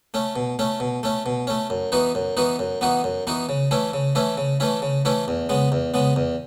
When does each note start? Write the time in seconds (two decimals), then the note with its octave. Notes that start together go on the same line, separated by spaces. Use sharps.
0.14 A3 C#4
0.36 B2
0.59 A3 C#4
0.80 B2
1.03 A3 C#4
1.26 B2
1.47 A3 C#4
1.70 F#2
1.92 E3 B3 D#4 F#4
2.15 F#2
2.37 E3 B3 D#4 F#4
2.59 F#2
2.81 E3 B3 D#4 F#4
3.04 F#2
3.27 E3 B3 D#4 F#4
3.49 C#3
3.71 E3 A3 C#4 E4
3.93 C#3
4.15 E3 A3 C#4 E4
4.37 C#3
4.60 E3 A3 C#4 E4
4.82 C#3
5.05 E3 A3 C#4 E4
5.28 E2
5.49 C#3 G#3 B3
5.72 E2
5.94 C#3 G#3 B3
6.16 E2